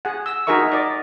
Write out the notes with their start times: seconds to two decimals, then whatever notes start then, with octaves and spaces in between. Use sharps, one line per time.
0.05 G#4 F#5
0.26 E6
0.47 D#4 F#4 G#4 A#4 E5 C#6
0.72 D5 D#5